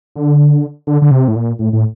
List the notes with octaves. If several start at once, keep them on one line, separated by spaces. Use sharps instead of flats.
D3
D3
D3
C3
A2
A#2
A2
A2